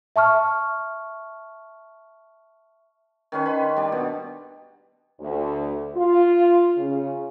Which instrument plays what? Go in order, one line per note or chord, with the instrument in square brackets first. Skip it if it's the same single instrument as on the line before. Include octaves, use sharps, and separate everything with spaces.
[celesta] E5 A5 C#6 F6
[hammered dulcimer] D#3 C#4 B4
B4 B5 C6
G3 D4
B2
[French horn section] D2
F4
C#3